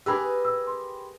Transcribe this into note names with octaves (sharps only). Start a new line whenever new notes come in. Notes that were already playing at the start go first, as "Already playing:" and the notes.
G4 G#4 A#4 B4 B5 E6
E6
C6